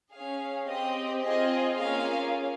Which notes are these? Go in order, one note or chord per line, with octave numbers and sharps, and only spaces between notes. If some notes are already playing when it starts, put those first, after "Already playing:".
C#4 G#4 F5
C4 G4 D#5
C4 F4 G#4 D#5
A#3 C#4 F4 G#4 F5